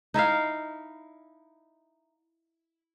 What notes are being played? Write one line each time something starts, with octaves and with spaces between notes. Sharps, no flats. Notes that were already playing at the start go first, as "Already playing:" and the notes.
D#4 E4 E5 F5